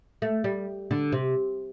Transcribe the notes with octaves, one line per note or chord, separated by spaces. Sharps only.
A3
G3
D3
C3